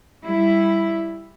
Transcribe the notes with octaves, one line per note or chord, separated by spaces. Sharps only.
G3 E4